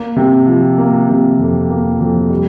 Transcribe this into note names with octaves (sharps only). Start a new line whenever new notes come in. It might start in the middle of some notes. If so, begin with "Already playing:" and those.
Already playing: A#3
C3
F3
A#3
C3
F2
A#3
F2
G3